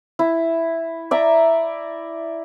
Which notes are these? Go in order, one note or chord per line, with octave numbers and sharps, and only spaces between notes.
E4
D5 E5 A#5